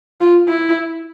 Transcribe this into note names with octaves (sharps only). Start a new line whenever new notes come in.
F4
E4